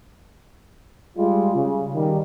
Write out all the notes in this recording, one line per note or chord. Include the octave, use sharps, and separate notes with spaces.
G3 G#3 F4
C#3
D#3 G3